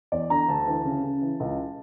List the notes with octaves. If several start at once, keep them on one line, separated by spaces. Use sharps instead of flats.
E2 D5
D3 A#5
D2 A5
E3
C#3
C#3
E3
C#2